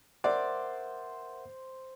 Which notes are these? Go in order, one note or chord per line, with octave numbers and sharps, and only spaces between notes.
A#4 C5 D5 E5 F#5